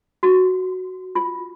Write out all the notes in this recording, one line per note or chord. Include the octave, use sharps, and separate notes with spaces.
F#4
F4